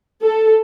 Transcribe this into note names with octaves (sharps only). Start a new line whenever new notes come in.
A4